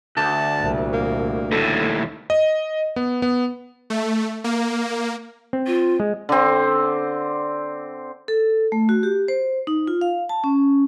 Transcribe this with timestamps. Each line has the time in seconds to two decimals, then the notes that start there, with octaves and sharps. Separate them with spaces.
0.17 D2 A5
0.59 C2 A#2
0.93 A#3
1.52 D#2 A2 A4
2.30 D#5
2.96 B3
3.22 B3
3.90 A3
4.44 A#3
5.53 C4
5.67 F4
6.00 G#3
6.29 D3 C4
8.28 A4
8.72 A3
8.89 F#4
9.03 G4
9.28 C5
9.67 D#4
9.87 F4
10.01 F5
10.29 A5
10.44 C#4